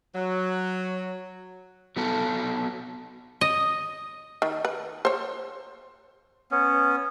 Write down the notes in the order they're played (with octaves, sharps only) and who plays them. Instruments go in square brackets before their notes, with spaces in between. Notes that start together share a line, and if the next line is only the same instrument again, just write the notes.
[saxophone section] F#3
[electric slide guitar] F#3 B3 A4
[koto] D#5
[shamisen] D#3
B4
C5 C#5
[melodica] B3 C#4